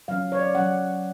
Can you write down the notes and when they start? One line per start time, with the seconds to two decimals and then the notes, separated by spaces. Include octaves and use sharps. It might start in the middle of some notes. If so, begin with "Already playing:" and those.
0.08 F#3 C#4 F5
0.32 C#5
0.39 D5
0.55 F#3 C#4 F#5